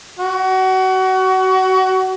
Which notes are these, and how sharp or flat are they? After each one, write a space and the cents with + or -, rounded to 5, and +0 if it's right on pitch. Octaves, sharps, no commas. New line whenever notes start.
F#4 +25